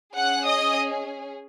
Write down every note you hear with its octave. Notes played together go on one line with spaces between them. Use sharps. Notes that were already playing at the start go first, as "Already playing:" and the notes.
C#4 G#4 F#5 F#6
D#5 D#6